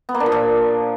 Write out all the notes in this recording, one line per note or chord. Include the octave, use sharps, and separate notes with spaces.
B3
A#3
D4
F3
A#2